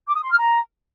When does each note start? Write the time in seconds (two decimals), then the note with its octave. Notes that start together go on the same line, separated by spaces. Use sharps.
0.07 D6
0.15 D#6
0.22 C6
0.30 F6
0.38 A#5